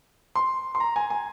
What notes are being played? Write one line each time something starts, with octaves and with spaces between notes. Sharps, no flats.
C6
C6
A#5
G#5
G#5